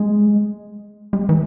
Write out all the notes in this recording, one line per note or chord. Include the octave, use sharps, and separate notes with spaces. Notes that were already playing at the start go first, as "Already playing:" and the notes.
Already playing: G#3
G#3
E3